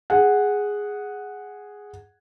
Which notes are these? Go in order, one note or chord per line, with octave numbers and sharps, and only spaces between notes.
G#4 F#5